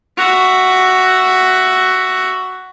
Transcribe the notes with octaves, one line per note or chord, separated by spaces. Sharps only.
F#4 E5